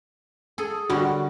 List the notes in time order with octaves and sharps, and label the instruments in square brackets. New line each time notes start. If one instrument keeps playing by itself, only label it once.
[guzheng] G#4 A4
[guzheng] D3 G3 [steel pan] F#4